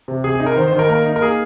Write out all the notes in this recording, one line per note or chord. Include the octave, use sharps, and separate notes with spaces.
C3
C3 G#4
G#4
D#4
A#4
D#3 C5
C5
D#3
A#4
A#3 A#4
D#4
A#4
A#3 G#4